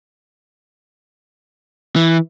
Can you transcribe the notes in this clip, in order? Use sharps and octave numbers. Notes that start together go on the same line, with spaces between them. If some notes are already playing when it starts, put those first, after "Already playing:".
E3